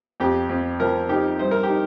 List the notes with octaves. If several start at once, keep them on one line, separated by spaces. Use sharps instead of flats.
F2 G4
F2
F3 A#4
D#4 G4
G2 C5
A#4
G4
D#4